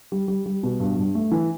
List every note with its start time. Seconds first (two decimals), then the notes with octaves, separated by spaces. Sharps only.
0.12 G3
0.28 G3
0.46 G3
0.63 B2
0.80 G2
0.97 G2
1.15 A3
1.31 E3